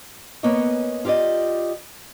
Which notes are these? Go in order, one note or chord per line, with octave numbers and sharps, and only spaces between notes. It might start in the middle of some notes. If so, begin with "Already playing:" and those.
A#3 B3 C#4 C#5 D#5
F4 G4 B4 D5 D#5